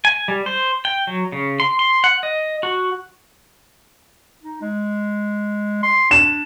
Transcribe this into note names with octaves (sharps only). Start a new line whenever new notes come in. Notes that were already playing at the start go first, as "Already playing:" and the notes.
G#5
G3
C5
G5
F#3
C#3
C6
C6
F#5
D#5
F#4
D#4
G#3
C6
D4 E7